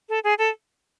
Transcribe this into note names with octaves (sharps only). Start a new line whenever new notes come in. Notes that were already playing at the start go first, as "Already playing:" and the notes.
A4
G#4
A4